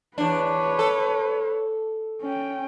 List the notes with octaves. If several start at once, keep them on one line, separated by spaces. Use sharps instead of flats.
E2 D4 B4 C#5
A4
C#4 G5